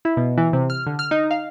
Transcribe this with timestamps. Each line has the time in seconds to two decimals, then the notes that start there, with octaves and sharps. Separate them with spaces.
0.05 E4
0.17 B2
0.37 E3
0.53 C3
0.70 F6
0.87 D3
0.99 F6
1.11 D#4
1.31 F5